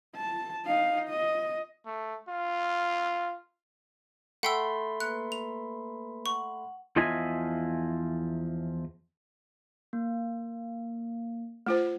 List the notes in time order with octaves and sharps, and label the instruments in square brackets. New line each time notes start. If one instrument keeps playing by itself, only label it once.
[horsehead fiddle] A5
D#4 F5
D#5
[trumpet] A3
F4
[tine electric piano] A3 B5 C6 [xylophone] F#5 G5 E6
[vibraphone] A#3 B4 [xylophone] F#6
[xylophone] F7
[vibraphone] F#5 [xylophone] C#6
[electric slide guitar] E2 F3 F4 D#5 E5 G#5
[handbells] A#3
[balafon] A3 F4 C5